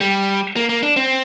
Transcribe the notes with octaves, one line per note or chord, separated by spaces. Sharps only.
G3
A#3
A#3
D4
C4